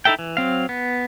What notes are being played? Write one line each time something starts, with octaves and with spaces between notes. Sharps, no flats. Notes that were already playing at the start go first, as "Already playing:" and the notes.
D#4 E4 A4 E5 G5
E3
F#3 C4 F5
B3